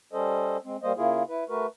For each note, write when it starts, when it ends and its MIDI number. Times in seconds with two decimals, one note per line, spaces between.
0.13 0.57 55
0.13 0.57 61
0.13 0.57 69
0.13 0.57 72
0.13 0.57 75
0.65 0.77 56
0.65 0.77 60
0.83 0.93 55
0.83 0.93 58
0.83 0.93 72
0.83 0.93 75
0.97 1.23 49
0.97 1.23 58
0.97 1.23 64
0.97 1.23 65
0.97 1.23 68
1.29 1.44 64
1.29 1.44 71
1.49 1.67 57
1.49 1.67 66
1.49 1.67 70
1.49 1.67 71